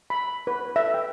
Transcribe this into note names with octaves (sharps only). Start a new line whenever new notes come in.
B5
B4
E5
G5